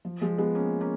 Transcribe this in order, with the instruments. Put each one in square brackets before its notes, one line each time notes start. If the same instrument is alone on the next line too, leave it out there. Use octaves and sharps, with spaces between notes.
[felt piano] F3
F3 G#3
G#3 B3
A#3 C#4
A#3 C#4